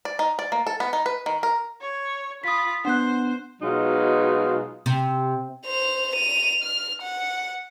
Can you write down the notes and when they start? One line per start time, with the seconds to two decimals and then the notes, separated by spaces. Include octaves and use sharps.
0.05 D5
0.19 D#4
0.39 D5
0.52 A#3
0.67 A4
0.80 B3
0.93 D#4
1.06 B4
1.26 D#3
1.43 A#4
1.81 C#5
2.44 F4 B5 D#6 B6
2.85 B3 D4 C5 F#5 F#6
3.62 B2 F#3 G#3 D#4 F4
4.86 C3
5.66 C5 F7
6.15 D#7 F7
6.63 F6
7.02 F#5